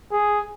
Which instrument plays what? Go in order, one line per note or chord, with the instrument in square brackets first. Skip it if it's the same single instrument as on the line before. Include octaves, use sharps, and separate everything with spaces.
[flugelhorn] G#4